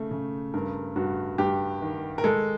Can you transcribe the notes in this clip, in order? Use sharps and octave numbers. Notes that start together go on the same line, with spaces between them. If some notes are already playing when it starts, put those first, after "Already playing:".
Already playing: C#3 A3
C#3
G2 A#4
G2 F#4
G2 G4
D#3
A#4
G#3 A4